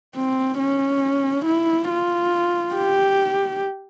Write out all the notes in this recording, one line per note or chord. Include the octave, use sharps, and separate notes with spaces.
C4
C#4
E4
F4
G4